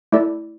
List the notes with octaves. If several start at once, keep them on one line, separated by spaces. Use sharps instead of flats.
A3 E4 A4 D5